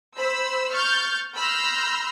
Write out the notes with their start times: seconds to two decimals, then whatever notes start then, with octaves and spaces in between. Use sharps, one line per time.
0.17 C5 B5 E6
0.72 C#6 F6 G6 A6
1.36 B5 C6 E6 F6 G6 A#6